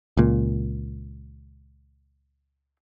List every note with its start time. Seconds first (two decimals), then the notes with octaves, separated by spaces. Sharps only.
0.17 C#2 A#2